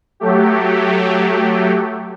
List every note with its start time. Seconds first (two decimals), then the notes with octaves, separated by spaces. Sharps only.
0.20 F#3 A3 G4